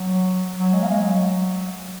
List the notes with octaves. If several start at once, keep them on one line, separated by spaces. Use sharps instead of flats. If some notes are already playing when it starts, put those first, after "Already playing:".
Already playing: F#3
F#3
G#3
A#3
G#3
F#3